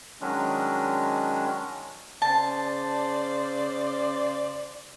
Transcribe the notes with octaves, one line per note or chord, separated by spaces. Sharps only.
D#3 F#3 G#3 C#4 D4
C#3 C5 D5 A5